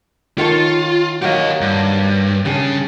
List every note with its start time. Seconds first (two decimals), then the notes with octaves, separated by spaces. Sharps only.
0.38 D#3 F4 A4 C#5
1.22 F#3 A#3 G4 D#5
1.61 G2
2.45 C#3 G3 D4 G#4